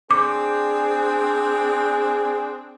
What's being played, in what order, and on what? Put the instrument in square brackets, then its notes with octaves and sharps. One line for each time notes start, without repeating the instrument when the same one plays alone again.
[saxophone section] C4 D4 [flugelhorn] G#4 [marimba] D6